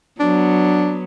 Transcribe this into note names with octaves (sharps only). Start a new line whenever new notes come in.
F#3 B3 D4